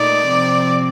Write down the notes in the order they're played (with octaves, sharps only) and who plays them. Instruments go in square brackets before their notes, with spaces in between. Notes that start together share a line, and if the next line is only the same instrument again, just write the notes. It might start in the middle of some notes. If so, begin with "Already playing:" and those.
Already playing: [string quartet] A#2 A3 D#4 [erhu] D5
[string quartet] C3 F3 C4